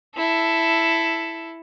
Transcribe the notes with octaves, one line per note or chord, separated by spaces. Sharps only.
E4 A4